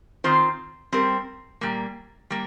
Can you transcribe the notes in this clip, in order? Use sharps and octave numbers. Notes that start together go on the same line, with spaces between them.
D#3 C4 F4 C5
G3 C4 G4 A#4
A#2 G3 A#3
G3 A#3